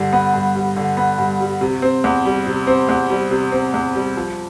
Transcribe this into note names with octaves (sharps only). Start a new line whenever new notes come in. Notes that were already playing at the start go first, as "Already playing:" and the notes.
Already playing: G2 D3 G3
B3
G2
G3
D3
B3
G2
G3
C3
C4
E2
G3
C3
C4
E2
G3
C3
C4
E2
G3
F3